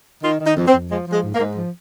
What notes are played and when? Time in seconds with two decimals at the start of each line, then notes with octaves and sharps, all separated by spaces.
0.23 D#3 F4
0.39 D#3
0.45 D#4
0.56 F2
0.67 C4
0.72 F2
0.90 F3 G#3
1.06 F3
1.12 G#3
1.23 G#2
1.34 A#3
1.39 G#2
1.56 F3